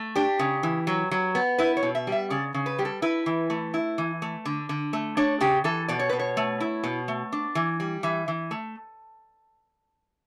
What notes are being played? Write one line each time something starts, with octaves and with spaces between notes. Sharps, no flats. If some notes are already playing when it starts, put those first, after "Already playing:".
Already playing: A3
D4 G4
C#3
E3
F#3
F#3
B3
E4 B4
C#5
B2
E5
G3
E5
C#3 D5
C#3
B4
G3 G4
A4
E4 B4
E3
A3
E4
E3
A3
D3
D3
A3
D4 C#5
C#3 G4
E3 A4
B2 D5
C#5
B2 B4
C#5
A3
E4
B2
A3
D4
E3
G3
E3 E5
E3
A3